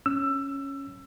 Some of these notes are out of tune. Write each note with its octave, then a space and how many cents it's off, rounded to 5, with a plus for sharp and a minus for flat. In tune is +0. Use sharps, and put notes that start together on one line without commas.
C#4 -5 E6 +20